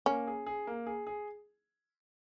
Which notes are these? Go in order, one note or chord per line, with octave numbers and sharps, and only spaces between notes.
A#3 C#4
G#4
G#4
A#3
G#4
G#4